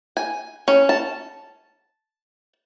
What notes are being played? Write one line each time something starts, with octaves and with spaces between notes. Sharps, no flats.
G#5
C#4
A5